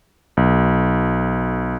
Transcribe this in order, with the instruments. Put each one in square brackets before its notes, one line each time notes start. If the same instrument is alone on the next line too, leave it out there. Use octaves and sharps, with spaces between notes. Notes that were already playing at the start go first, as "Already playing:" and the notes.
[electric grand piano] B1